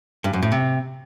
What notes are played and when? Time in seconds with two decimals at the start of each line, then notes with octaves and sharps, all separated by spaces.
0.24 G2
0.33 F#2
0.42 A2
0.52 C3